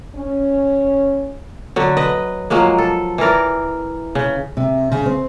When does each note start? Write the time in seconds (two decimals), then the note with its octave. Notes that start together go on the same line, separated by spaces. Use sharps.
0.15 C#4
1.76 D3 F#3
1.97 B4 D#5
2.50 F3 F#3 G#3 A#3
2.78 A4
3.18 E3 E4 A#4 D5
4.15 C#3
4.57 C3
4.92 C#3
5.06 C4